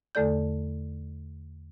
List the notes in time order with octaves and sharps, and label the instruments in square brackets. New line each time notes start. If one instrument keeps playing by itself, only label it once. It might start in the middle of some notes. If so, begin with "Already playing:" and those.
[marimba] E2 D3 A3 A4 D5 G6